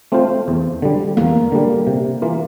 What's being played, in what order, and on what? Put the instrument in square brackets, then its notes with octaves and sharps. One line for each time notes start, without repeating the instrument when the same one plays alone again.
[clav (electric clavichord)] A3 C4 F4 C5
E2
D3 G3
[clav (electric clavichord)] E2 [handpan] A#3
[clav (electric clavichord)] D3 G3
C3
E3 A#3 F4